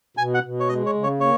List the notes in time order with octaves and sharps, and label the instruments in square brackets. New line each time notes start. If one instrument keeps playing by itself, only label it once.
[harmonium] B2 [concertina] G#5
[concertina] F#5
[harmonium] B2
[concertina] C#5
[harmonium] G#3 [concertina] D#5
[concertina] C#5
[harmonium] C#3
[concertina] C#5
[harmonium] A#3 [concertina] C#5